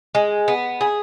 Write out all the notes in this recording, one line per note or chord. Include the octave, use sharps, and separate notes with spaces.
G#3
B3
G#4